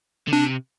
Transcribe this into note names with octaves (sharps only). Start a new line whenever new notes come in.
D3
C3 D4